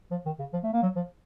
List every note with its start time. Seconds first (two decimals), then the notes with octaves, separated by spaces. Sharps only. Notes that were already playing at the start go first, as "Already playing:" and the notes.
0.11 F3
0.26 D#3
0.39 C#3
0.53 F3
0.64 A3
0.73 A#3
0.82 F#3
0.96 F3